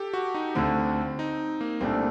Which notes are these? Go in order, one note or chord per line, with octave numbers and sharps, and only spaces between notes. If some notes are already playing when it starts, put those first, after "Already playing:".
Already playing: G4 A4
F#4
D#4
D2 D3 A3 C4
D#4
A#3
C2 A#2 A3 C4 D4